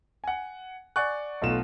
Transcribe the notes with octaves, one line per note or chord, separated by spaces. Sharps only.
F#5 G#5
D5 F#5 G#5 C#6 F#6
B1 B2 A3 F4 E7